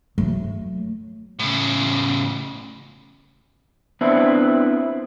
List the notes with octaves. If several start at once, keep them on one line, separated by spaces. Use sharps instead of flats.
F#3 A3
A2 C#3
B3 C4 D4 E4